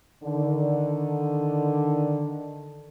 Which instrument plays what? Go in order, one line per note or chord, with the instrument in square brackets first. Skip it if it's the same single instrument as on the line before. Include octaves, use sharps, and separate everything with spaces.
[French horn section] D3 D#3